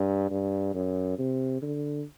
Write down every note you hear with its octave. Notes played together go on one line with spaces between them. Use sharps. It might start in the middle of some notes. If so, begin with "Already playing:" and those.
Already playing: G2
G2
F#2
C3
D3